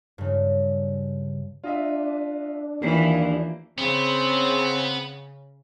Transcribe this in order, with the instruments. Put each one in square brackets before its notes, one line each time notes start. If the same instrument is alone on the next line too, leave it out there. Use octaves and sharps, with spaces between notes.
[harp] G2 C#3
[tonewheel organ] D4 [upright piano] F4 D#5 E5
[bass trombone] D#2 [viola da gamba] E3 F3 [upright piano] A#3
[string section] C#3 [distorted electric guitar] B3 [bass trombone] C4